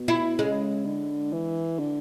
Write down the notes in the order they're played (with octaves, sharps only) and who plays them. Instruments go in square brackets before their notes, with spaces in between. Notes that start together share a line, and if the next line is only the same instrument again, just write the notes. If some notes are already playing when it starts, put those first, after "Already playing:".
Already playing: [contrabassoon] B2
[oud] E4
[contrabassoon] C#3 [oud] G#3
[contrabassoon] D3
E3
D3